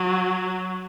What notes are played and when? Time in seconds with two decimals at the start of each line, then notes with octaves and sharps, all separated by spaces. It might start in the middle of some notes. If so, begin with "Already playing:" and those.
Already playing: F#3